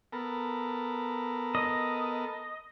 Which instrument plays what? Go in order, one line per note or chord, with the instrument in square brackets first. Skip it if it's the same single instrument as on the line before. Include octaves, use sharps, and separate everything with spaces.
[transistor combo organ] B3 A4 A#4
[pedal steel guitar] D#5